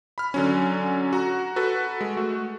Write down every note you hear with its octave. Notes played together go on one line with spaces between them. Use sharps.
B5 F6
D3 F#3 C#4
F#4 A#5
F#4 A4 B4
G#3
A3 F#4